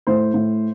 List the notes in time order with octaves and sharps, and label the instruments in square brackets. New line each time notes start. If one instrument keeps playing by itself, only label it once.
[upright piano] A2 C5
A2